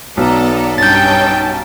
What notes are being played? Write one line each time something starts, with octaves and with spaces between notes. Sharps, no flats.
B1 B3 A4 D5 A#5
G2 C#4 D#4 G5 A5 G6 A6